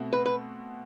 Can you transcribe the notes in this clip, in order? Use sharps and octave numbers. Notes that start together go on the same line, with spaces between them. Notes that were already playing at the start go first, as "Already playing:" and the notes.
Already playing: B2 A3 C4 F#4
B4
B4